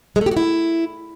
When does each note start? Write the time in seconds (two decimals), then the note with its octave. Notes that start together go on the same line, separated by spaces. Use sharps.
0.16 G#3
0.21 A3
0.26 G4
0.31 F#4
0.37 E4